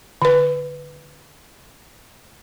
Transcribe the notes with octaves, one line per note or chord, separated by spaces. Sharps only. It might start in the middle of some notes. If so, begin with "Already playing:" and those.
D3 B4